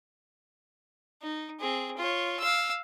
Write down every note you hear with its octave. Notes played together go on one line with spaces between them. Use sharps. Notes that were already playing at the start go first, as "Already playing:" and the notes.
D#4
C4 G#4
F4 C#5
F5 E6